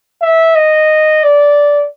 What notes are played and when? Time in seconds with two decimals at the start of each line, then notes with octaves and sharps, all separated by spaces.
0.22 E5
0.55 D#5
1.23 D5